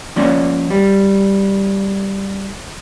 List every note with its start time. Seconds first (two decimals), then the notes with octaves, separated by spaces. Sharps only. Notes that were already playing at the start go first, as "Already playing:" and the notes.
0.16 F3 A#3 C#4 C#5 D5
0.70 G3